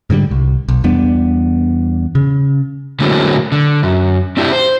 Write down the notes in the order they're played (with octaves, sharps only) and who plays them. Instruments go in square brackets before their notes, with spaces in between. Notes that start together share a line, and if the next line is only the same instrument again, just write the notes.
[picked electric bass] G#2 D3 F#3 G3
C2
B1
E2 G3 B3 D4
C#3
[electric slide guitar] A2 D3 F#3 G#3 A#3 C4
D3
F#2
C4 D4 E4 G4
C5